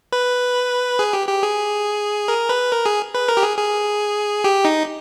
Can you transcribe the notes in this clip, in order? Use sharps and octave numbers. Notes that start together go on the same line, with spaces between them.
B4
G#4
G4
G4
G#4
A#4
B4
A#4
G#4
B4
A#4
G4
G#4
G#4
G4
D#4